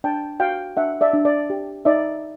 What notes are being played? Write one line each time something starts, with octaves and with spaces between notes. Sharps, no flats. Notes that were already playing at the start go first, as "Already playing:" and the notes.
D4 G5 A5
F#4 F5 G5
D4 E5 F#5
D5 E5
D4
D5
G4
D#4 D5 E5